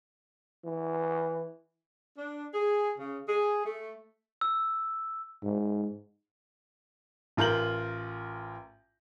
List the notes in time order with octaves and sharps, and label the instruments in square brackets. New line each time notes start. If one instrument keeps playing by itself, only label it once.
[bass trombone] E3
[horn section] D4
G#4
C#3
G#4
A3
[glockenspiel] E6
[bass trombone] G#2
[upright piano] A1 F4 A#4 G6 F#7